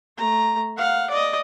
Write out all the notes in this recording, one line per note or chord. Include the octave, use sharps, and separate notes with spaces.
A3 A#5
F5 F#5
D5 D#5